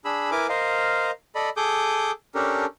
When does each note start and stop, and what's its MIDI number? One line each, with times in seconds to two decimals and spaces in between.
0.05 0.30 62
0.05 0.30 68
0.05 0.30 83
0.05 0.30 88
0.31 0.47 64
0.31 0.47 70
0.31 0.47 71
0.31 0.47 80
0.31 0.47 86
0.49 1.11 70
0.49 1.11 72
0.49 1.11 75
0.49 1.11 77
1.35 1.50 69
1.35 1.50 74
1.35 1.50 75
1.35 1.50 83
1.57 2.11 68
1.57 2.11 69
1.57 2.11 86
1.57 2.11 87
1.57 2.11 91
2.35 2.66 61
2.35 2.66 62
2.35 2.66 67
2.35 2.66 69
2.35 2.66 70